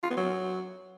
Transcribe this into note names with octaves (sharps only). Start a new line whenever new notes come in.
F4
B3
F#3